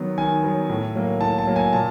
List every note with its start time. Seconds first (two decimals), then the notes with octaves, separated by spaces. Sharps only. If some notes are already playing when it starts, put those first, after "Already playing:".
Already playing: D#3 F#3 B3
0.18 D#3 G#5
0.43 F#3 B3
0.69 A2
0.95 F#3 A#3
1.21 A2 A5
1.38 A5
1.47 F#3 A#3
1.56 G#5
1.73 A#2 A5